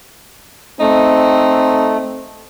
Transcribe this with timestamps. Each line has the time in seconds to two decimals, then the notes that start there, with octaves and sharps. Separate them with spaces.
0.80 A3 C4 D#4